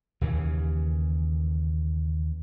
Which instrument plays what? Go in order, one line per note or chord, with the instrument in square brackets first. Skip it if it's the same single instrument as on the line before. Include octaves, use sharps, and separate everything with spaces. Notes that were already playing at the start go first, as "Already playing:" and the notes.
[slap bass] D#2 C#3 E3